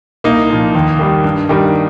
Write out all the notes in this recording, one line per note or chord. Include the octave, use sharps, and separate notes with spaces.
C2 A#3 D#4
A#2 F3
D#2
D#3 G3
G2
D#3 G3